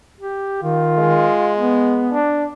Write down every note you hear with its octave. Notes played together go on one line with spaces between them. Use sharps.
G4
D#3 F4
G#3
B3
D4